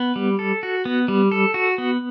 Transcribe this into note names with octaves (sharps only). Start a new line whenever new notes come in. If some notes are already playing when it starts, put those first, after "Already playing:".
Already playing: B3
G3
A4
F#4
B3
G3
A4
F#4
B3